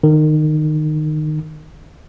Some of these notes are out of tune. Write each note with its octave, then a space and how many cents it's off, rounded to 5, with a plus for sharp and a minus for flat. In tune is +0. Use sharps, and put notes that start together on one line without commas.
D#3 -25